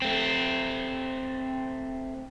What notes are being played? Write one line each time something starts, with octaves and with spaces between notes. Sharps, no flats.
A3 C4